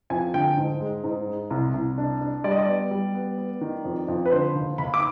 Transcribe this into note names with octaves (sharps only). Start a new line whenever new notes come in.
F2 G#5
D3 G5
G#2
G#3
G#2
G#3
C2
C2
D4
D4
G3 D5
D#5
D5
B3
G3
B3
B3
D#3
F2
F2
B4
D3 C5
D#2
D#2 B5
D6